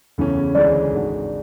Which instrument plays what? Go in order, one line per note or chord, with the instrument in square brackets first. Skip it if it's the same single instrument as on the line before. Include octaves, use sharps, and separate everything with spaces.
[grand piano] E2 C#3 E3 A3 C#4
[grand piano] D2 C#3 E3 G#3 C#4 [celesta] D5
[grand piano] G#1 G#2 G#3 D4 F#4